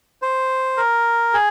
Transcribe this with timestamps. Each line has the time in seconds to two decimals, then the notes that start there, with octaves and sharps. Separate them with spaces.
0.22 C5
0.77 A#4
1.34 G#4